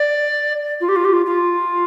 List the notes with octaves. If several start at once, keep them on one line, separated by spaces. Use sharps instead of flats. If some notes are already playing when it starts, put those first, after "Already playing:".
Already playing: D5
F4
G4
F4
G4
F4
F4